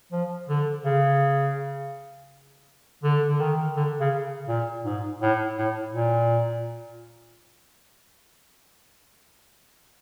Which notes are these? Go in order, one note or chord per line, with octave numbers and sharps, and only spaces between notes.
F3
D3
C#3
D3
D3
D#3
D3
C#3
A#2
G#2
A2
A2
A#2